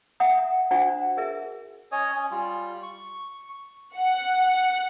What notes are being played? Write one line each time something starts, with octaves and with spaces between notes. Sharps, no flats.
E5 F#5 A#5 D#6
D4 F#4 C5 F#5 A#5
G#4 A#4 E5
C#4 C#5 D#5 D#6
C#4
G3 F4
C#6
F#5